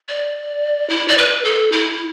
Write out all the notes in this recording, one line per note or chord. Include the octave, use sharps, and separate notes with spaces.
D5
E4
D5
B4
A4
E4